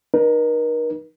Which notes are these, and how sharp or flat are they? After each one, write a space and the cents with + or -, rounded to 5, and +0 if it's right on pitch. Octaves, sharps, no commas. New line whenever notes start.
D#4 -25 A#4 +40